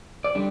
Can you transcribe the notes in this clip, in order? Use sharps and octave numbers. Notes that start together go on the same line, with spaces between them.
D5
D3 G3 D4